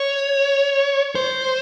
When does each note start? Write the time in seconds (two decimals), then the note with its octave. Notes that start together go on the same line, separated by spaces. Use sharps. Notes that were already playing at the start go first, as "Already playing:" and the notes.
Already playing: C#5
1.15 C5